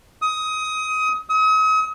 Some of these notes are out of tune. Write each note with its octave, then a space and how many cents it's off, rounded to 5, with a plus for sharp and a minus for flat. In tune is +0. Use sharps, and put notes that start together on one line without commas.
D#6 +20
D#6 +40